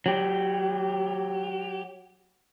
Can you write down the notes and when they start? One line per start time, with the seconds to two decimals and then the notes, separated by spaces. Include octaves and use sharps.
0.06 F#3 G4